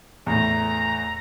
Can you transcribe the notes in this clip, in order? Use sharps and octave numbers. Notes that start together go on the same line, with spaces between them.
E2 A2 A#5